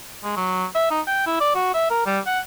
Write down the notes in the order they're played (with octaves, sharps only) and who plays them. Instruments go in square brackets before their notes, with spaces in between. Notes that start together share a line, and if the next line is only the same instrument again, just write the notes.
[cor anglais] G#3
F#3
E5
D#4
G5
E4
D5
F#4
E5
A#4
G3
F#5